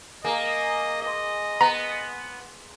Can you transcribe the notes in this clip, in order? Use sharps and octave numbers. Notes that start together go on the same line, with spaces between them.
A#3 G#4 A#4 D#5
D5 D#5 C6
B3 A#5